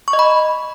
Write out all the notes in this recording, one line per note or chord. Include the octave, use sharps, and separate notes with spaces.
C#6
D#5
B5